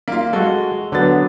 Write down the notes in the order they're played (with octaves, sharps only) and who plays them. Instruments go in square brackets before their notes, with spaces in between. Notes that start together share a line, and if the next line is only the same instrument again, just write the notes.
[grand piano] A#3 F4
[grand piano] G#3 [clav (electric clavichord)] F#4 A4
[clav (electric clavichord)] D3 B3 [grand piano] F#3 A6